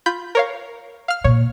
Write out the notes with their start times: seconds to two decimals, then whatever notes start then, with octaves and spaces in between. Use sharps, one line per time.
0.06 F4 B5 G6
0.35 A#4 C#5 F5
1.08 F5 F6
1.24 A#2 C#5